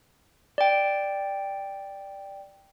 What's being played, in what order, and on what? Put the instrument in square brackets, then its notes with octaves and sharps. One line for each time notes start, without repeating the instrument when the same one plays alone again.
[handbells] D5 G5